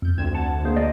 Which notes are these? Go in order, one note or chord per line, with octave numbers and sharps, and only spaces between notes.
F2 G6
D2 C4 G#6 E7
F#5 A5
A#3 G#4 C5
D5 D#5